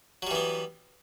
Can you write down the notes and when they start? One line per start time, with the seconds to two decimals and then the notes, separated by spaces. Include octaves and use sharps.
0.22 F#3
0.27 G3
0.31 E3
0.35 B3